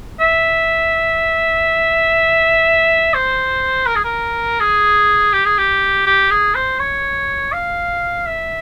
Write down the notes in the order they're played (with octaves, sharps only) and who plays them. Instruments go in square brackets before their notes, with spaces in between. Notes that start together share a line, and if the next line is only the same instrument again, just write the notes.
[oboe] E5
C5
A#4
G#4
A#4
G#4
G4
G#4
G4
G4
G#4
C5
C#5
F5
E5